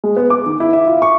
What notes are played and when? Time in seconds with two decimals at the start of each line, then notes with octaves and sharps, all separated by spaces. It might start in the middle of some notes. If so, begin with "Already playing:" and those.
0.04 G#3
0.16 B3
0.30 D6
0.46 D#3
0.60 E4
0.73 E5
0.87 F4
1.02 C#6